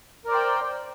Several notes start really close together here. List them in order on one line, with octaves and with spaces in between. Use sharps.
A#4 D5 C5 G5